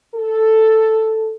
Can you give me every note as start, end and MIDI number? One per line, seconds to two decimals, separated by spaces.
0.15 1.36 69